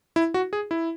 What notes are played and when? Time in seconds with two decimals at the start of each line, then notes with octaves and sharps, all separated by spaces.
0.16 E4
0.34 F#4
0.53 G#4
0.71 E4